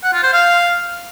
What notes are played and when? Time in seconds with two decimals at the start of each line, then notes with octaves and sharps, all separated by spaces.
0.04 F#5
0.13 F4
0.23 C5
0.33 F5